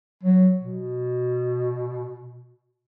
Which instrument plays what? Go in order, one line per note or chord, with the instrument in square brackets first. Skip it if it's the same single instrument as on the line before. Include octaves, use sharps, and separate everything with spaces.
[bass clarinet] F#3
B2